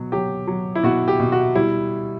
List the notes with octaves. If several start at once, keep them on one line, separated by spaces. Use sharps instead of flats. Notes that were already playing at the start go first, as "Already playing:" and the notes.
Already playing: B2 F#3
F#3 G4
F#3
E4
B2 F#4
G4
B2
F#4
G3 E4